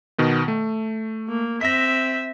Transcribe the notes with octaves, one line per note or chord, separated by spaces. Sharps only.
B2 D#3 B3
A3
A#3
C4 E5 A#6 B6